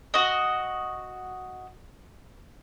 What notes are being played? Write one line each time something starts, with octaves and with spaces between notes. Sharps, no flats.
F#4 D#5